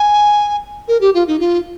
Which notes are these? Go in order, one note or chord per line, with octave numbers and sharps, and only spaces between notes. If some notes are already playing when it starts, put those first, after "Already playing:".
Already playing: G#5
A#4
G4
F4
D#4
F4